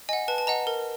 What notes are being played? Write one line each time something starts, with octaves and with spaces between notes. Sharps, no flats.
D#5 F#5 G#5
B4 A5
A5
D#5 F#5 A#5
A#4